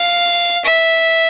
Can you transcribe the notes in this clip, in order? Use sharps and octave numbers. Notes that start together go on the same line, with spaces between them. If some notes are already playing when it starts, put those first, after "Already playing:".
Already playing: F5
E5